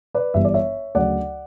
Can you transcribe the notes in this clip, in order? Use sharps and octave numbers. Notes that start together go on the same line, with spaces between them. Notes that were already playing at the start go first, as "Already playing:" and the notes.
B4 D5
G1 G2 E3 G3 E5
D5
C#5 E5
D2 C#3 F#3 D5 F#5